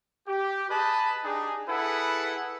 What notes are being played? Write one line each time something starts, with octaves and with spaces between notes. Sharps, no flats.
G4
G#4 B4 D#5 A5 B5
D4 D#4 G4 G#4
E4 G#4 A4 B4 F#5